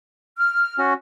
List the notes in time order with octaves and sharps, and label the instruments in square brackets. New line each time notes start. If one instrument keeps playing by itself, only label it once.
[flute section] F6
[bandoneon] C#4 F#4